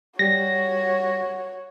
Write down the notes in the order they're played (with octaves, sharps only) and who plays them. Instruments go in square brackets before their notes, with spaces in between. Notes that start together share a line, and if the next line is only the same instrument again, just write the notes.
[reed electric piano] G3 G4 [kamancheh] F#4 C#5 [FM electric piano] A#6